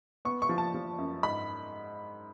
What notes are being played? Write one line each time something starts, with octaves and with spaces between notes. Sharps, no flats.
B3 C#6
C#6
F3
A5
F3
F#2
G#2 B5